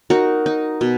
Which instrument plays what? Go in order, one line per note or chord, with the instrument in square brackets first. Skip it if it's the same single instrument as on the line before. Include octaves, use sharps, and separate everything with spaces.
[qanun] D#4 F#4 A#4
D#4
B2